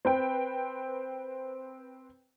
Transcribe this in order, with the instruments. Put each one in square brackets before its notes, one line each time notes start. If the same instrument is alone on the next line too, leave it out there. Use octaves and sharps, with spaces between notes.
[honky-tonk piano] C4 B4 G5